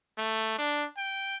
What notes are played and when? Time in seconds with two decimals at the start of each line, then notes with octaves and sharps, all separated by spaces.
0.18 A3
0.58 D4
0.97 G5